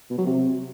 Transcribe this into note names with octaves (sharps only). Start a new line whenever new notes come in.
B2
F#3
C3